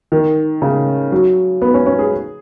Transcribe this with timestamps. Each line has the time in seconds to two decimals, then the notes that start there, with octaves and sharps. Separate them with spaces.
0.12 D#3
0.62 C#3
1.12 F#3
1.62 B3
1.74 C#4
1.86 C#4
1.99 G#4